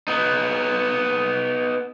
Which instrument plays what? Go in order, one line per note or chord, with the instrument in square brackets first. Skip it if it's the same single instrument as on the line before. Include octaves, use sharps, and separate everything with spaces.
[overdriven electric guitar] B3 D#4